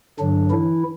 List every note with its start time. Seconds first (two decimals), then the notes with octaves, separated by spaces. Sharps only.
0.19 G2 D3 F#3 D4
0.51 E3 E4